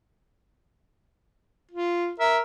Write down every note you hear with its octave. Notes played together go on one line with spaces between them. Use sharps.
F4
A#4 E5